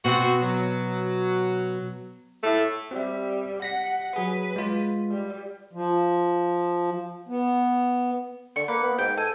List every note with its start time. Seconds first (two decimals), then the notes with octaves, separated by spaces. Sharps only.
0.05 B2 C4 F#4
0.42 F#3
2.43 A2 A3
2.91 G3 C4 G4 E5
3.62 F#5 A#6 B6
4.16 F#3 G#4 B4
4.56 G#3 F4
5.11 G3
5.73 F3
7.28 B3
8.56 D3 C#6
8.68 A#3 B4
8.83 B3
8.98 G#2 G5
9.17 A4 G#5